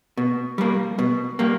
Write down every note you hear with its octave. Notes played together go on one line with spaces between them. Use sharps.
B2
G3 A#3
B2
G3 A#3